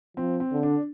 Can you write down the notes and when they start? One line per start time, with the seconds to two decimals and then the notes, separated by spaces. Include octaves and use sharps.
0.17 F3 C4
0.40 C4
0.52 D3
0.63 D4